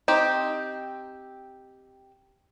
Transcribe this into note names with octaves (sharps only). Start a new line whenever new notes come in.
C4 D#4 G4